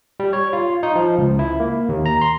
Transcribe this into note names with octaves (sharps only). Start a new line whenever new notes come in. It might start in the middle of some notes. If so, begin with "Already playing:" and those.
G3
C#5
F4
D#4
F3
C#2
E4
A#3
D#2
A#5
C6